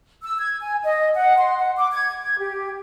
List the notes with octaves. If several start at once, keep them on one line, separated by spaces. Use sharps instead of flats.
E6
G#6
G#5
D#5
F#5
C6
F#5
D6
G#6
G#6
G4